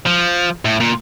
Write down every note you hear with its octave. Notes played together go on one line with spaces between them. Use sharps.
F3
A2
A#2